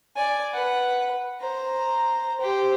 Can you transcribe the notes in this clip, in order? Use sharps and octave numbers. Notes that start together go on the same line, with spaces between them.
D5 G#5
B4 F#5
C5 A#5
G4 C5